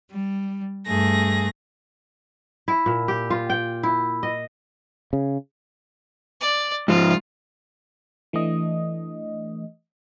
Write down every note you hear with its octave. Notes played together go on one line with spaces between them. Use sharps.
G3
G2 A3 G#4 A#6
E4
A#2
G4
F4
G5
E4
D#5
C#3
D5
G#2 F3 F4
E3 A3 D4 D#5